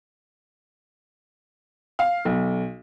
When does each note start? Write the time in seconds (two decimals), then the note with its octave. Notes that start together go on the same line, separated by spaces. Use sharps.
1.99 F5
2.25 B1